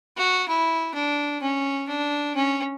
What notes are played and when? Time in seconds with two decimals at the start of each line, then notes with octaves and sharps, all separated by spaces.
0.17 F#4
0.48 E4
0.94 D4
1.41 C#4
1.88 D4
2.35 C#4